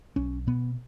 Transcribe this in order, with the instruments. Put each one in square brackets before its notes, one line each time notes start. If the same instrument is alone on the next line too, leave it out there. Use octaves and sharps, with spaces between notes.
[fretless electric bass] B1 C#4
B2 B3